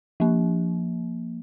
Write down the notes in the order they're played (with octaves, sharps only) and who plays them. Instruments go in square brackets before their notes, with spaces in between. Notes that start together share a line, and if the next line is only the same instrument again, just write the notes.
[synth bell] F3 A#3